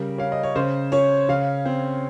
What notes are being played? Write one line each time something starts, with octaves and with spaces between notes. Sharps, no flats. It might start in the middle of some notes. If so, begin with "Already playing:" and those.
Already playing: C#3 G3 A#4
C#4 F5
D#5
C#5
C#3 C5
C#4 C#5
C#3 F5
C4